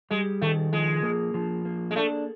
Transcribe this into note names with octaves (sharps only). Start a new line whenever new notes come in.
G3 G#3
D#3 A3
F3 G#3
A#3
F3
A#3
G#3
A3 D4